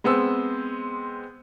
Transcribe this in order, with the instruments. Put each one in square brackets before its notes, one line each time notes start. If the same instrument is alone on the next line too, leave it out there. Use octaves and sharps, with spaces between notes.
[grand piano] G#3 B3 C4 E6